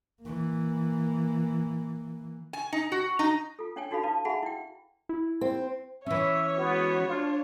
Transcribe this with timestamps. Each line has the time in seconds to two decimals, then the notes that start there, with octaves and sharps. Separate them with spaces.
0.22 E3 A#3
2.53 G#5
2.73 D#4
2.92 F#4
3.19 D#4
3.59 F4 A4
3.76 C#4 D4 C#5 D5 G5 G#5
3.91 D4 D#4 F#4 A4 F5 B5
4.03 D#4 E4 B4 D5 F5 A5
4.25 F#4 G#4 E5 F#5 G#5 B5
4.43 E4 D5 G5
5.09 E4
5.41 C4
6.06 E3 C#4 C#5 E5
6.58 G#3 B3 F#4
7.09 D4 F4